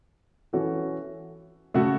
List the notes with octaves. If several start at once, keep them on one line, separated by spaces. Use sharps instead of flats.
E3 C#4 F#4 A4
C#3 A3 F#4 A4